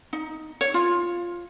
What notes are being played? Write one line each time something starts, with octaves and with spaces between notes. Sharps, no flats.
D#4
C#5
F4